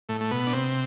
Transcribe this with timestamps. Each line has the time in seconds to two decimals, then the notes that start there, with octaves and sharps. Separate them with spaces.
0.09 A2 A3
0.21 A3
0.31 B2 B3
0.47 D4
0.53 C3 C4